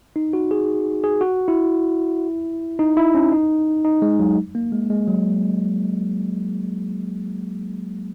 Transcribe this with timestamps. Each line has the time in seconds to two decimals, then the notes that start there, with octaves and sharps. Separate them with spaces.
0.16 D#4
0.33 F#4
0.51 G#4
1.04 G#4
1.21 F#4
1.48 E4
2.79 D#4
2.97 E4
3.15 C#4
3.32 D#4
3.85 D#4
4.02 G#3
4.19 F#3
4.55 A#3
4.72 G#3
4.90 G#3
5.07 F#3